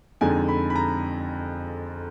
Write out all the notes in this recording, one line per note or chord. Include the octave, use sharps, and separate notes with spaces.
F2 D3 G#3 D#4 G#5
B5
B5
A#5